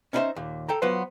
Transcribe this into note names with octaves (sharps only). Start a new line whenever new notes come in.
C#4 D#4 E4 G4 C5 E5
D#2 A#2
A4 G5 A#5
F#3 B3 F4 B4 C5